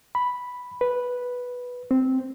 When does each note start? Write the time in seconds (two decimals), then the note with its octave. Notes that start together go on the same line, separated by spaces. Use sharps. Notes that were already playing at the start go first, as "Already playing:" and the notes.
0.15 B5
0.81 B4
1.91 C4